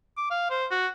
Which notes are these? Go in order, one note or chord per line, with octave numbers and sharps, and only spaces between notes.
D6
F5
C5
F#4